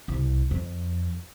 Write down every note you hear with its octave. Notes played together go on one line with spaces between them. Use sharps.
C2
F2